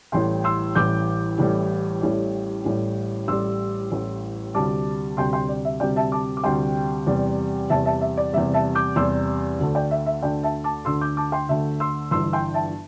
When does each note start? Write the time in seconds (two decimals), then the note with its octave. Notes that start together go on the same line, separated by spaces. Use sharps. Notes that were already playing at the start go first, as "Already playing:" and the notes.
0.12 A1 A2 E3 G3 G5 C6
0.44 C6 E6
0.75 A1 A2 E3 G3 D6 G6
1.39 A1 A2 E3 G3
2.02 A1 A2 G3
2.65 A1 A2 G3
3.28 A1 A2 G3 C6 E6
3.91 A1 A2 G3
4.54 D2 C3 G3 A5 D6
5.17 D2 C3 G3 G5 C6
5.33 G5 C6
5.49 D5
5.65 E5
5.80 D2 C3 G3 D5 G5
5.96 E5 A5
6.12 A5 D6
6.37 D6
6.44 D2 C3 G3 G5 C6
7.07 E2 C3 G3
7.70 E2 C3 G3 E5 A5
7.86 E5 A5
8.01 E5
8.17 D5
8.33 E2 C3 G3 E5
8.54 E5 A5
8.75 D6 G6
8.96 E2 C3 G3 C6 E6
9.59 D2 D3 A3
9.75 D5 G5
9.91 E5
10.06 E5
10.22 D2 D3 A3 D5 G5
10.43 E5 A5
10.64 A5 D6
10.85 D2 D3 A3 C6 E6
11.01 D6 G6
11.17 A5 D6
11.32 G5 C6
11.49 D2 D3 A3 E5
11.80 C6 E6
12.11 G1 G2 E3 C6 E6
12.33 G5 C6
12.54 E5 A5